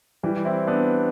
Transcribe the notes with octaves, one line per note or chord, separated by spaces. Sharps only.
E3 G3
C4 E4
B3 D4